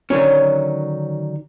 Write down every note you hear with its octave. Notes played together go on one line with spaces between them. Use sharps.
D3 D#3 F#3 C#4